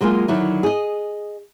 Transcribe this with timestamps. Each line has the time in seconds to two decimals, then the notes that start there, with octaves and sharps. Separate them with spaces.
0.01 F#3 G#3 A#3 F4 G#5
0.28 D3 D#3 F#3 E4
0.63 G#4 D#5